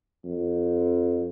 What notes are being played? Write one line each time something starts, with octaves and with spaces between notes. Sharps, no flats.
F2